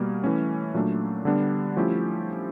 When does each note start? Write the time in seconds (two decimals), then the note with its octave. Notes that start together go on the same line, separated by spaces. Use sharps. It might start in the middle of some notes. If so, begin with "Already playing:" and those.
Already playing: B2 G3 A#3
0.24 E3 A3 C#4
0.74 A#2 F#3 A3 D4
1.25 D3 G3 B3 D4
1.77 F3 A3 C#4 E4 G4